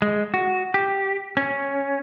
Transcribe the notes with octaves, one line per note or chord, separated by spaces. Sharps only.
G#3
F#4
G4
C#4